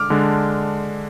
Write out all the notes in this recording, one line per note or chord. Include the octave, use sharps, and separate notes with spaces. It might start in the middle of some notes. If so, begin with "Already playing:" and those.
Already playing: D3 G#3 D6 F6
D3 G#3 D4